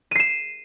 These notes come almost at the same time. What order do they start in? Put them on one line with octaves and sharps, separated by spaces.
D#7 C7 E7